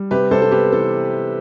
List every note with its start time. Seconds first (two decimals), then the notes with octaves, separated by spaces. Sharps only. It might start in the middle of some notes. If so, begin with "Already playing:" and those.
Already playing: G3
0.11 C3 G4 B4
0.31 C3 A4 C5
0.42 A4
0.51 B3 G4 B4
0.72 E3 A4